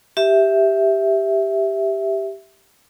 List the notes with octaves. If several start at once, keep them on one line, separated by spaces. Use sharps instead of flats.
G4 E5